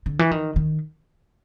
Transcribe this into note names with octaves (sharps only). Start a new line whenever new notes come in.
D3
E3
D#3
D#3